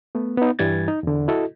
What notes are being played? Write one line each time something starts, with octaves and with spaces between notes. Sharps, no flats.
A3 B3
B3 D#4
G2 E3 G3 G#6 A6
D#4
E2 D3
E4 F#4 A4 D#5